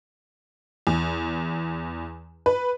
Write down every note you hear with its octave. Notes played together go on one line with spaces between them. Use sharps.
E2
B4